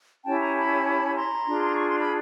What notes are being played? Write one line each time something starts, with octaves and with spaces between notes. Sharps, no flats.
C#4 E4 G4 G5 A5
G#5 A#5
A5 B5
A#5 C6
D4 F4 G#4
C#6
C6
B5